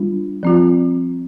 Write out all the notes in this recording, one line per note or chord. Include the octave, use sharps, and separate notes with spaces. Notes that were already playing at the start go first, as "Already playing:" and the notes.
Already playing: G3 D4 F4
F3 C4 F4